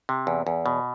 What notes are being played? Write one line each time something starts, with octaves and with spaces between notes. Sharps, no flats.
C3
E2
E2
B2